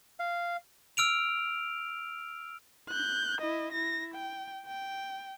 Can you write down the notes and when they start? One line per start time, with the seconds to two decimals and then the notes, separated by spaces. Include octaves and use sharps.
0.19 F5
0.97 E6 F6 D7 F7
2.89 F#6 G6
3.41 E4 D#5
3.72 E4 A#6
4.14 G5
4.66 G5